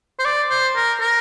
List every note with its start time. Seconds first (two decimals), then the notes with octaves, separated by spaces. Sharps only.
0.19 C5
0.25 D5
0.50 C5
0.76 A#4
1.00 A#4